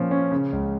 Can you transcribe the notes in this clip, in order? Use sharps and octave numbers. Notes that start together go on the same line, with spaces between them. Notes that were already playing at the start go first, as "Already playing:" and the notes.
Already playing: A#2 F3 C#4
C#4
C#3
C#2